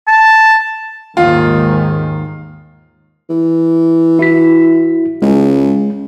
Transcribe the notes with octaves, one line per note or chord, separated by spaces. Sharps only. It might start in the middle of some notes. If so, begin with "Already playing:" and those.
A5
D#2 G#2 D#3 F4
E3
E4 F#4 B6
C#2 G#3 C#4